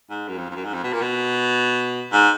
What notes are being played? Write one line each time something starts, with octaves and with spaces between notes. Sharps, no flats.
G#2
F#2
F2
F2
F#2
G#2
F2
B2
A#2
B2
G#2